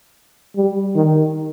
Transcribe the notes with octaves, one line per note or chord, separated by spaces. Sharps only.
G3
D#3